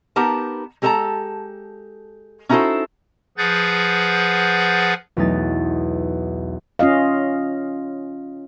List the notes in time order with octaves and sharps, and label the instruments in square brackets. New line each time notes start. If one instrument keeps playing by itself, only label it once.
[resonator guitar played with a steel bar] B3 D#4 G4 A#4 A5
G#3 G4 A4 A#4 A5 A#5
C#4 D#4 E4 F#4 A4 C5
[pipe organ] F3 G#4 B4 F#5 G6 A6
[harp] B1 E2 A3 D#4 A6
[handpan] C#4 F4 D#5 F5